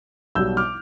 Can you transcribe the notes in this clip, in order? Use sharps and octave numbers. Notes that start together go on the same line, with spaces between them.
B1 B2 G3 E6 G6
D6 F6